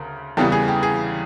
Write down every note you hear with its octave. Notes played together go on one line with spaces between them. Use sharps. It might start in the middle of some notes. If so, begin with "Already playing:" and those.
Already playing: D2 C#3 A#4
E2 C#3 E3 G3 B3 G4 A4
G#4
G4
G#4